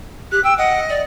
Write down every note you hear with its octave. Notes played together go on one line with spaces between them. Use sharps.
G4 F#6
G5 E6
D#5 F#5
D5